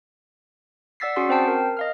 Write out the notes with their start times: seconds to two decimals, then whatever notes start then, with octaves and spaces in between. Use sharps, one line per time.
1.00 D5 F#5 E6 A6 B6 C7
1.16 C#4 F#4 G#4 F#5 C6
1.29 C4 C5 G5 A5 C7
1.48 A#4
1.77 D#5 F5 F6